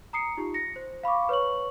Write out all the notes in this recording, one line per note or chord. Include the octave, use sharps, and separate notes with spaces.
A#5 D#6 C7 C#7
D#4 F4 G4
A#6 C#7
C5
F5 B5 C#6 D6
B4 C#5 C#6 F#7